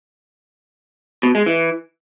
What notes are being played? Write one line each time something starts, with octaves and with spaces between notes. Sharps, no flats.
B2
G#3
E3